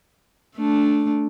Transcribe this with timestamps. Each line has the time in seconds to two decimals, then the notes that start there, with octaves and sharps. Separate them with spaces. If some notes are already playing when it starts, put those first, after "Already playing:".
0.56 A3 D4